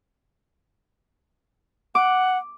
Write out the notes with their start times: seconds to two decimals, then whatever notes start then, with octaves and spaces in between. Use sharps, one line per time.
1.95 F#5 D6